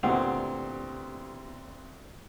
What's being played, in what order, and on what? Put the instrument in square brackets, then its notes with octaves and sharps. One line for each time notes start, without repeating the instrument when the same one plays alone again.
[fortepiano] D2 A#2 [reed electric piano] B3 E4 G4 [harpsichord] C4 [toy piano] F#5